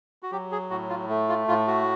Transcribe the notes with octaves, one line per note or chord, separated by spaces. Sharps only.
F#4
F#3 G4
G#4
A2 F#4
F4
A3
F4
A2 F4
F#4